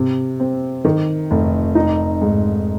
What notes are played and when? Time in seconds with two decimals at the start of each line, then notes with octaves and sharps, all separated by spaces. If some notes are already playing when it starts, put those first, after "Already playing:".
Already playing: C3
0.40 C4
0.85 D#3
1.31 F1
1.75 D#4
2.22 G#2